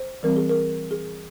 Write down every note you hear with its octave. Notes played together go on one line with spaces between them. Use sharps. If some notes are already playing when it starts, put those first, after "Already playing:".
Already playing: C5
E3 G3 C4 A#4
G#4
A#4
G#4